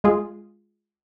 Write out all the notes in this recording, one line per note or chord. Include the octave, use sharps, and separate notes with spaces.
G#3 F4 G#4